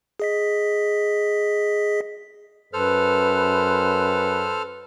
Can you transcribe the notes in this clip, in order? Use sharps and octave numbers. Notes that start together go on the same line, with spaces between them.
G#4 D#5 B6
F#2 A4 B4 C5 F6